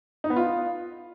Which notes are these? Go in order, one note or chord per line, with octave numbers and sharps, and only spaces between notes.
D#4
B3
F4